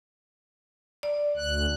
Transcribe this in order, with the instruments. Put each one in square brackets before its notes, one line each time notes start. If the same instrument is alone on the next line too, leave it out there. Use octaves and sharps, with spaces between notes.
[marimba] D5
[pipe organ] D2 F#6